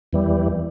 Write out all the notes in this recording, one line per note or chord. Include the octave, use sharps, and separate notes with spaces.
E2 E3 G3